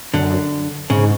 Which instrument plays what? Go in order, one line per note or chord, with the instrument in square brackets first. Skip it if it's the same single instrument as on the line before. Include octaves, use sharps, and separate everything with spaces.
[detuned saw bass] F#2 [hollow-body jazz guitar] D3
[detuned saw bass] G#2 [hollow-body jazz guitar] C#3